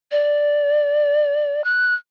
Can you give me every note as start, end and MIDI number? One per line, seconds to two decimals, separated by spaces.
0.12 1.64 74
1.64 1.94 90